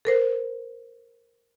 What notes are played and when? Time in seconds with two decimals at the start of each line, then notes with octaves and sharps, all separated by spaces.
0.05 A4 A#4 C5